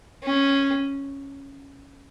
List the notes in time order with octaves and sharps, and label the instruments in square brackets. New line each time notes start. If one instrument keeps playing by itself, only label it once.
[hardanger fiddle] C#4